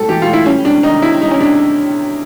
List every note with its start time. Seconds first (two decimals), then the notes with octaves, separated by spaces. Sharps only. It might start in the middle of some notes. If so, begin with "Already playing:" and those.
Already playing: A2 G3 A4
0.09 E3 G4
0.22 F4
0.28 A2
0.33 E4
0.46 G3 C#4
0.64 C3 D4
0.83 D#3 D#4
1.02 C3 E4
1.21 G3 D#4
1.31 C#4
1.40 C3 D4